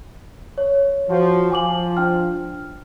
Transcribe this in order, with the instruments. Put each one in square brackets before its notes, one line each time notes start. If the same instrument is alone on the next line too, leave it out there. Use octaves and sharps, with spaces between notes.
[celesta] C#5
[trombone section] F3 F#4
[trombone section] F3 [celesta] G#5 D6 F#7
[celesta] D4 G5 F6